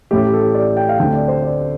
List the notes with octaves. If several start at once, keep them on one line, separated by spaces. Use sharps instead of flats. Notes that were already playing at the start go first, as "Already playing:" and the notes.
A1 A2 A3 G4
A4
D5
G5
F5
D2 D3 A3 C4 G5
D5
C5
D5